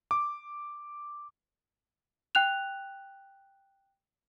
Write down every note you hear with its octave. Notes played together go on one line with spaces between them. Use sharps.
D6
G5 F#6 F7